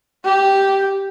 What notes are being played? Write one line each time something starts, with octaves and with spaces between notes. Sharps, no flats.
G4